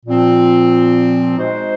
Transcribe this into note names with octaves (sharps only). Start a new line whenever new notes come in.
A#2 F3 C4
G#3 D#4 F#4 C5